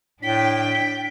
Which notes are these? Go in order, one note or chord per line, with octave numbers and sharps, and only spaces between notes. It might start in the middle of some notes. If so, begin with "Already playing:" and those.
A2 D4 G5 B6